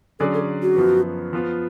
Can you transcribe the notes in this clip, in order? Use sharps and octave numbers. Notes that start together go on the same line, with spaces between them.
D3 F#3 C#4 G#4 A4 D5
A4
F#4
F#2 F3 B3
F3 B3 F4